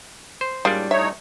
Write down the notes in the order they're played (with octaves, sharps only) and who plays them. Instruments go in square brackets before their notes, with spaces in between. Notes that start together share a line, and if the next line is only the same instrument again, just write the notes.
[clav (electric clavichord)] C5
[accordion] A2 [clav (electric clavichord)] G3 D4 [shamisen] G#3 A#3 F4
[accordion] A2 D#4 C#5 [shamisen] E5